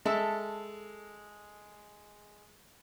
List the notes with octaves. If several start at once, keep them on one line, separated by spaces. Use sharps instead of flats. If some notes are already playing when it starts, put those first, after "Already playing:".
G#3 A4 E5